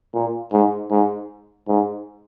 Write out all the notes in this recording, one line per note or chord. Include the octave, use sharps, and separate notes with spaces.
A#2
G#2
G#2
G#2